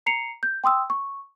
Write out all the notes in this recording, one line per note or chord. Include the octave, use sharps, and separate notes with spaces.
A#5 C7 C#7 F7
G6
G5 C6 D#6 E6
C#6